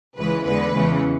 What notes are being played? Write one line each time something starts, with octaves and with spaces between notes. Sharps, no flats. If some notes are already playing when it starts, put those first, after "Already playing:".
C#2 C#3 E3 G#3 B4
E2 D3 G#3 B4
E2 C#3 E3 G#3